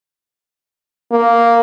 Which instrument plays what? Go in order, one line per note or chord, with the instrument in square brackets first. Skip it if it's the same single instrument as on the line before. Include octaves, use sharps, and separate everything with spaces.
[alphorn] A#3